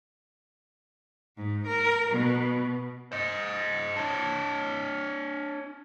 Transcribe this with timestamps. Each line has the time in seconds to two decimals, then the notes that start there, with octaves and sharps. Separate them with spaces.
1.36 G#2
1.67 A#4
2.11 B2
3.12 C5 D#5
3.96 D4 C#5